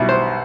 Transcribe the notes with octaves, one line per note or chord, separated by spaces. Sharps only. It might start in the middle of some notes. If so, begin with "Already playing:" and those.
Already playing: B1 B2 G3 E4
C5